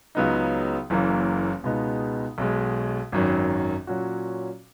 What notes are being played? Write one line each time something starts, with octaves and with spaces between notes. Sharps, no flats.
C#2 C#3 F#3 B3 D#4
F#1 F#2 E3 A#3
C#2 B2 G#3 B3 D#4
B1 B2 G#3
G#1 F#2 D#3 F#3
A#2 F#3 C#4 F#4